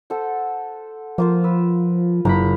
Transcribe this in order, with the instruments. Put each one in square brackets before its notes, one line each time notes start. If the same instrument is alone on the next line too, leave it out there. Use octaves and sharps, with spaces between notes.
[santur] A4 C5 F#5
[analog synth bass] F3 [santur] A#3 F4 C5
[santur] B4 [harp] E6
[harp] F#1 B5 [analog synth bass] C#3 [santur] F5 A#5